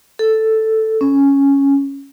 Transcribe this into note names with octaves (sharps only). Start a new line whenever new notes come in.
A4
C#4